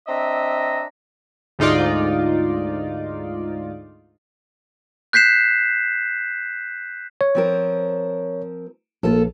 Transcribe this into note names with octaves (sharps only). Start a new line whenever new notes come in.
C4 D4 D#5 E5 A#5
D2 G#2 D#4 F4 D5
F#6 G6 B6 C7 E7
C#5
F3 C4 A#4
A#1 A#3 F4 A4